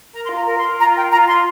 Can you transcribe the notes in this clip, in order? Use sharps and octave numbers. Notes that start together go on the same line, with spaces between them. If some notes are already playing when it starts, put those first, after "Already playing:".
A#4 A#5
C6
F4
A#5
A#4
C6
A#4
F4 A#5
A#4 G5
F4 A#5
F4 C6